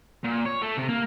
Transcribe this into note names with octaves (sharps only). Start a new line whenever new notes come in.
A#2
C#5
A3
C3
A#3